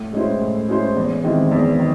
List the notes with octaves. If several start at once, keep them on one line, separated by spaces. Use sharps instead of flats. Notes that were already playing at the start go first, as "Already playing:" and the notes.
Already playing: A2
G#3 C#4 E4 C5
A2
G#3 C#4 E4 C5
E2
D#3 G#3 C4 E4
E2
D#3